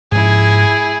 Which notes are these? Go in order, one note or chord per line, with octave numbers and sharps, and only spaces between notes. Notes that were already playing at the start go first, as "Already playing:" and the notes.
G#2 F3 E4 G#4